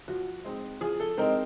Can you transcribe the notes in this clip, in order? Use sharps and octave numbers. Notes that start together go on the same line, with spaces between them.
F3 F#4
G#3 C4 D#4
F3 G#4
A4
G#3 C4 D#4 A#4